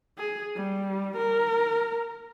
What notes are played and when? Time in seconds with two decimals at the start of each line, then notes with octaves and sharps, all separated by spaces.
0.18 G#4
0.55 G3
1.17 A#4